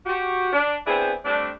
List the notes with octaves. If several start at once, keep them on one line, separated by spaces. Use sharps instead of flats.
F#4 G4
D4
B3 C4 D4 E4 G#4 C5
G3 A3 C4 D4